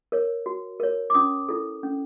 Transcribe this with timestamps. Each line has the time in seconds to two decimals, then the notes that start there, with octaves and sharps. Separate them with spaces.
0.12 A#4 C#5
0.46 F#4
0.80 A#4 C#5
1.10 D6
1.14 C#4 D#6
1.49 E4 A4
1.83 C#4